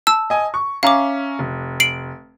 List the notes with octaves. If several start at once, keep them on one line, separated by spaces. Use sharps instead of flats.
A5 E6
D#5 G#5
C#6
C#4 E5 F5 A#5 D6
F1
C7 D7 F#7